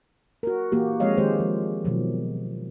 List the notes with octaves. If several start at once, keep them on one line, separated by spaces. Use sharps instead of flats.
F#4 A#4
E3 A#3 F#4 G4
F3 G#3 C4 C#5 D#5 F5
D#3 G#3 G4 C5
F3
B2 D#3 F3 F#3